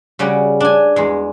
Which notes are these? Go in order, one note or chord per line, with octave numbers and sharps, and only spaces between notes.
C#3 G3 C#4 F#4
D4 G#5
E2 G#3